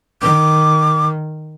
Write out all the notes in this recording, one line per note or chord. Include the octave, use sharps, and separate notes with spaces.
D#3 D6